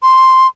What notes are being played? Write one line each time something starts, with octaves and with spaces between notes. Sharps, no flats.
C6